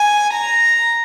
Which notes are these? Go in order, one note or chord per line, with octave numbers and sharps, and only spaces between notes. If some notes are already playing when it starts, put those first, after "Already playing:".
Already playing: G#5
A#5